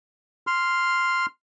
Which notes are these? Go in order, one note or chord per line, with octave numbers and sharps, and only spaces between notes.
C6 F6